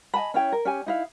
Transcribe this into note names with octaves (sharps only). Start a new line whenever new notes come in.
D#5 G#5 A5 B5
C#4 E4 C#5 G5
A#4
C#4 G4 G#5
D#4 E4 F5